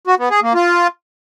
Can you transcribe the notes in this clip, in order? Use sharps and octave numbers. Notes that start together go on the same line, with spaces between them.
F#4
B3
G#4
A#3
F4